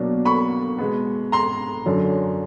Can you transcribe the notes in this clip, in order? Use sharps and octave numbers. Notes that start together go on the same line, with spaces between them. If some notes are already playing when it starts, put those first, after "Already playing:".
Already playing: B2 F#3 A#3 D4
B5 C#6
B2 G#3 B3
A#5 C6
F#2 D3 F#3